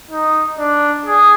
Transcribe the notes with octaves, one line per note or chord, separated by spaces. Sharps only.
D#4
D4
G#4